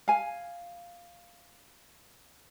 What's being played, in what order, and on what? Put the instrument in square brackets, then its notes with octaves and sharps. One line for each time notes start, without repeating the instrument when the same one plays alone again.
[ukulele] F5 G#5